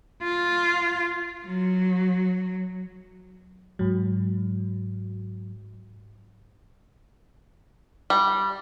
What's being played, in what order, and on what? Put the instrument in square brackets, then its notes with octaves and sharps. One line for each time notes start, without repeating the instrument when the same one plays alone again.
[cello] F4
F#3
[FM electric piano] G#2 F#3
[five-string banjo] G3